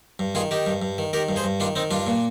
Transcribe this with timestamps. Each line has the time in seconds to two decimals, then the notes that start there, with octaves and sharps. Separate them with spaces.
0.19 G2
0.35 D#3 F4 G#4
0.51 D#3 D#4 G4
0.67 G2
0.82 G2
0.98 D#3
1.13 D#3 G4 A#4
1.29 G2
1.36 G#4 C5
1.44 G2
1.60 D#3 D4 F4
1.76 D#3 C4 D#4
1.91 G2 D4 F4
2.07 A#2